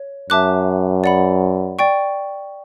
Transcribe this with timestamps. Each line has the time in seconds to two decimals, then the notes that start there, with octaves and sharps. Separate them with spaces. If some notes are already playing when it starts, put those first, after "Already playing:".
Already playing: C#5
0.30 F#2 E5 A5 D6 F#6
1.04 D5 F#5 B5
1.79 D5 G5 C#6